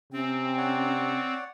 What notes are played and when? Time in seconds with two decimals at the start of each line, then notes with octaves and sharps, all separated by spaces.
0.13 C3 C4 C#4
0.58 C#5 D5 F#5